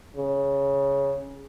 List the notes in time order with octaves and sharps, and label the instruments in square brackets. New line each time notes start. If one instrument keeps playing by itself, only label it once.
[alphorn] C#3